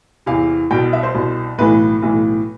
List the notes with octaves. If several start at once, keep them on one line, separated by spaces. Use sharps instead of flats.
E2 C3 E3 F5
C2 B2 G5
E5
C5
C2 B2
B1 A2 E3 B4
B1 A2 E3